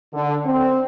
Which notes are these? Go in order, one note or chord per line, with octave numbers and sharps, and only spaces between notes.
D3
C4